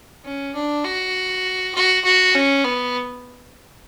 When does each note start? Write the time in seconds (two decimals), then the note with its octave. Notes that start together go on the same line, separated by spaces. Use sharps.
0.24 C#4
0.54 D4
0.84 F#4
1.74 F#4
2.04 F#4
2.35 C#4
2.64 B3